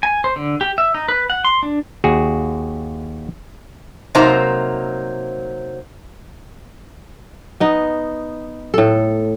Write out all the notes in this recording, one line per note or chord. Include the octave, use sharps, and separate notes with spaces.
G#5
C5
D3
G4
E5
D#4
B4
F#5
C6
D4
D#2 F#4 G#4
C3 F#3 A#3 D#4 C5 A#5
B3 D#4
A2 A4